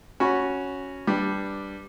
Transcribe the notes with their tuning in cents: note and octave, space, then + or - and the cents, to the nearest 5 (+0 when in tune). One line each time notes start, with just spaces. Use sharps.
C#4 +0 F#4 +0 B5 -20
G3 +0 D4 +0 B4 +0